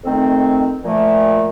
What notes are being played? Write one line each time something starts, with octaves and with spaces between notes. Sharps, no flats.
F2 D#3 A3 C4
A#2 F3 A3